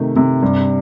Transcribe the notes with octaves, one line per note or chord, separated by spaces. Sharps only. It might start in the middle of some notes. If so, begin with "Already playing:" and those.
Already playing: C3 D#3 A3
C3
G2